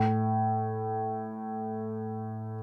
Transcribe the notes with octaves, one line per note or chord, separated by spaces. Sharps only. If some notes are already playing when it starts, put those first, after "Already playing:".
Already playing: A2